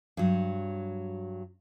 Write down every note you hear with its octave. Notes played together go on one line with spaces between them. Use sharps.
G2 F#3